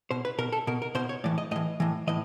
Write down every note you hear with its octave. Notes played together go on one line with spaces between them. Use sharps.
B2 C5
B4
B2 A#4
A4
B2 A#4
A#4
B2 C5
C#5
A2 E3 D5
D#5
A2 E3 D#5
A2 E3
A2 E3 D#5